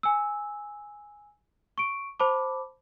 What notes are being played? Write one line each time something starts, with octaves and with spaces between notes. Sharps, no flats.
G#5 E6
C#6 D7
C5 A5 B5 D6